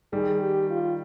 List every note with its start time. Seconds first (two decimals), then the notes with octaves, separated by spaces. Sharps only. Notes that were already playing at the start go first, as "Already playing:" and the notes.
0.13 D#3 G3 G#4
0.41 G4
0.70 F4